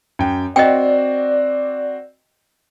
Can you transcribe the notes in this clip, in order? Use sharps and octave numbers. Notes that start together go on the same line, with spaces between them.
F#2 G5
C4 F#4 D5 D#5 G5